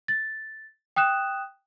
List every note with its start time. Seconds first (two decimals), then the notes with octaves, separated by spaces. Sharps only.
0.08 A6
0.96 G5 D#6 F#6 E7